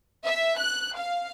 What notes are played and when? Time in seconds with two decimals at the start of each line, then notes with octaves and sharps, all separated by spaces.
0.24 E5
0.59 F#6
0.97 F5